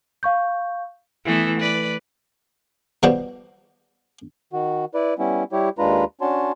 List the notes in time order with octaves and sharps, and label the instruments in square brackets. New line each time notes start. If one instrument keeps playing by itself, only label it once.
[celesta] F5 C#6 G6
[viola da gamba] E3 A3 B3
B4 D5
[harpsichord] B2 F3 G3 F#4 G4
[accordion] D#3 F#4
E4 B4 D5
G3 B3 C#4 E4
G3 E4 G4 C#5
D#2 G#3 D4 F4 B4 A#5
C#4 D4 F#4 C#5 A5 C6